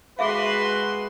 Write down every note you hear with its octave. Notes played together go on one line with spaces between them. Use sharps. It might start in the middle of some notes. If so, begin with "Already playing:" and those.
G#3 F#4 G#4 B4 E5 F5 C6